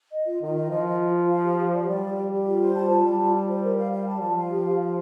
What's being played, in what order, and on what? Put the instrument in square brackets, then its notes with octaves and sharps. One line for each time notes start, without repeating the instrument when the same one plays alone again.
[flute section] D#5
F4
[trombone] D#3 [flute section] F4
[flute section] D#5
[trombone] F3 [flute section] F4
[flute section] F4
F4
F4
F5
G4
G4
D5
[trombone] G3 [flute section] D5
[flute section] G4
G4
G4
F4
C5
A5
F4
[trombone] G3 [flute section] A5
[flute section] F4
F4
C5
A#4
F5
F5
A5
[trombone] F3 [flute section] A5
[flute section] F5
G4
F5
F5